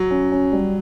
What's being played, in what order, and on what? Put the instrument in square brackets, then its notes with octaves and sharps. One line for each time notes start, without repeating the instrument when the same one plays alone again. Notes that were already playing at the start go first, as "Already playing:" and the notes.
Already playing: [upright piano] F#3
[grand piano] C#4
C#4
G3